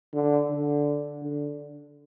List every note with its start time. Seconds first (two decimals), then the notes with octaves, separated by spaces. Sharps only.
0.14 D3
0.50 D3
1.23 D3